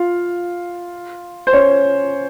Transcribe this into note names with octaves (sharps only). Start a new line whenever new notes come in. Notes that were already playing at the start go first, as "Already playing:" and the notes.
Already playing: F4 F5
C5
C#4 C#5